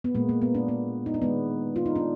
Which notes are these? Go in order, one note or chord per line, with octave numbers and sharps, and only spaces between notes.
B3
A#2 G#3 A#3
A#3
B3
D4
B3
D#4
D4
D#3 G#3 B3
F4
D#4
D4